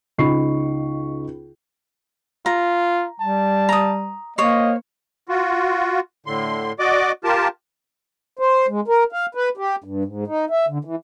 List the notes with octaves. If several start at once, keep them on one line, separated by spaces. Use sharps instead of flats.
C#2 D#4 B5 C#6 C7
F4 A#5
G3 A5
A#5 D#6
A#3 C5 C#5 D#5
F4 F#4
A2 D3 C6
F#4 D5 D#5 D6
F4 G4 A#4 A5
C5
G#3
A#4
F5
B4
G4
G2
G#2
D#4
E5
D3
E3